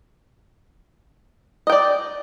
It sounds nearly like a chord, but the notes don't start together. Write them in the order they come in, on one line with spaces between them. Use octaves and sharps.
D#5 G5 D5